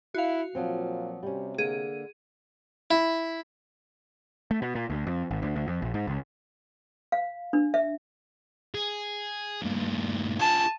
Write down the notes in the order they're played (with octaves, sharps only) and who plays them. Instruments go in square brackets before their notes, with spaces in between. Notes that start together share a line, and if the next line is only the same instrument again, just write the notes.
[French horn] E4 [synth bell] F#4 F5
[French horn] A#2 [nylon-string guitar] F3 F#3 C4
[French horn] C3 [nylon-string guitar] G3 C#4
[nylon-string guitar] D3 A#3 [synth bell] G#4 D#7
[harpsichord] E4
[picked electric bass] A3
B2
A#2
D2
F2
G#1
D2
D2
F2
A#1
G#2
C#2
[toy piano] F5
D4
E5
[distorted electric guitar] G#4
G2 A#2
[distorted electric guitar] F4 G#4 [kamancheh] A5